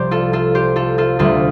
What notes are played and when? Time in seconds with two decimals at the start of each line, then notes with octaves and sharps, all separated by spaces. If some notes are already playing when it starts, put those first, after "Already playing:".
Already playing: C2 C3 F3 G4 C5 D5
0.11 F4 A4
0.33 F4 A4
0.55 G4 C5
0.76 F4 A4
0.98 F4 A4
1.19 D2 C3 G3 F4 A4